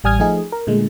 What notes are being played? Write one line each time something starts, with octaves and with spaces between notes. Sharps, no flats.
A1 G3 G#5 D#6 F6 G#6
F3 A3 D#4 G#4
A#4
A#2 D3 G#3 A3